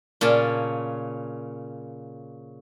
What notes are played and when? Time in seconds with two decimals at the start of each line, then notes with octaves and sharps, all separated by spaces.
0.21 A#2 C#3 C#4 A5